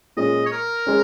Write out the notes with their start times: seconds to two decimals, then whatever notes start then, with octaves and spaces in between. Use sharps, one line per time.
0.17 A#2 G#3 C#4 D#5
0.46 C#5
0.52 A#4
0.86 G#3 C#4